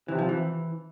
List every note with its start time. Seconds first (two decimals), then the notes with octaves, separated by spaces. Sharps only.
0.08 C3 E3
0.19 F3
0.29 E3